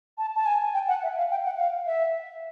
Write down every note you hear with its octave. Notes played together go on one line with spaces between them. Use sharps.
A5
A5
G#5
G5
F#5
E5
F5
G5
F#5
F5
E5